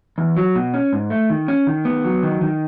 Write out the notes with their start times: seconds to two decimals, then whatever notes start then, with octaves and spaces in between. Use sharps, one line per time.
0.18 E2
0.37 F#3
0.55 B2
0.74 C#4
0.93 G#2
1.10 A3
1.30 D#3
1.48 C#4
1.67 D#3
1.85 B3
2.04 F#3
2.23 D#3
2.41 D#3